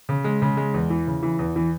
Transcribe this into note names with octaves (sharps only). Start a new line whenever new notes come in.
C#3
G#3
C#3
G#3
E2
E3
C#3
E3
E2
E3